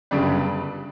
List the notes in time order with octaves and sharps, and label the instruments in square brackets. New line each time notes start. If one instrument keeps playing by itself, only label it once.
[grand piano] G1 F#2 C#3 G3 D4